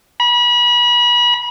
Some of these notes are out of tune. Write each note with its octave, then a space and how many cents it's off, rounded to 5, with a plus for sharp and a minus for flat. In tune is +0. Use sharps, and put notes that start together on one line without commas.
B5 -35